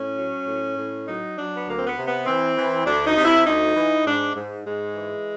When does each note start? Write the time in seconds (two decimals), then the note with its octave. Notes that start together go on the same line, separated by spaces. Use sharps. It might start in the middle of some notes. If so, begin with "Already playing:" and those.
Already playing: A2 C#4
0.17 F#3
0.47 A2
0.78 A2
1.07 F#3 D#4
1.37 F#3 D4
1.57 B3
1.66 D2 A#3
1.78 C4
1.86 B3
1.97 C3
2.06 B3
2.26 E3 C4
2.56 E3
2.86 D2 D4
3.06 D#4
3.16 C3
3.25 E4
3.46 D2 D#4
3.76 E3
4.06 G#2 D4
4.35 G#2
4.65 G#2 G#3
4.95 E3